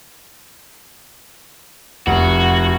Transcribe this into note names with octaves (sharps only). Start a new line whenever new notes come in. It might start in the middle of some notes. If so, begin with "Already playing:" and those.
F1 F#4